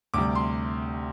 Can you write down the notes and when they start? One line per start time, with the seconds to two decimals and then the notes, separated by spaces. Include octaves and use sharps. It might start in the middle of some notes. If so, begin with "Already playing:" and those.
0.14 D2 C3 G3 D6
0.35 C6